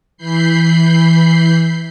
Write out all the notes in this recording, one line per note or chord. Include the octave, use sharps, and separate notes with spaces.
E3 B5 G6 C7